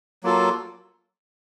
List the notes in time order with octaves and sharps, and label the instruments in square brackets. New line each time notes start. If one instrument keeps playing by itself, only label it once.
[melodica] F#3 A#3 F4 A4